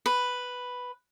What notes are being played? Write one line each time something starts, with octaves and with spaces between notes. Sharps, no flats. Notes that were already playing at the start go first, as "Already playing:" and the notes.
B4